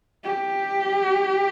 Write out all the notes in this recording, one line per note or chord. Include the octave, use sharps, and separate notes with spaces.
G4